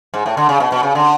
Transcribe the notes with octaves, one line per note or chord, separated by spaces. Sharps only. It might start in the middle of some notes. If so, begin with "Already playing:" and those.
G#2
A2
D3
C#3
B2
B2
C#3
D3